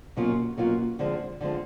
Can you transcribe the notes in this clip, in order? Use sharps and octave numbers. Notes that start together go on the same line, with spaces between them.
B2 F#3 A#3 C#4 F4
B2 F#3 A#3 C#4 F4
D3 F3 G#3 C4
D3 F3 G#3 C4